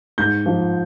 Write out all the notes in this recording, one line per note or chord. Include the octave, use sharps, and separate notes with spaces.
G#2 G6
F3